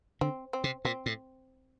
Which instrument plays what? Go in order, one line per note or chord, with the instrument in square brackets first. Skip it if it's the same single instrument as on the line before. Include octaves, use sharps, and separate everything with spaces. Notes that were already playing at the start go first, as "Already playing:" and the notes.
[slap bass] D3 [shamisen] C4
[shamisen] C4
[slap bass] C3
[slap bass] A#2 [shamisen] C4
[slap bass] A2